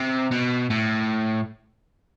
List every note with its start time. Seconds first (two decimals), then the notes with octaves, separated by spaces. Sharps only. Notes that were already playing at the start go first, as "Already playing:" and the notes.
Already playing: C3
0.31 B2
0.70 A2